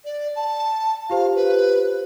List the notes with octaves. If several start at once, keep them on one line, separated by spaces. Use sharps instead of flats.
D5
A5
F4 G4 C5 F5
B4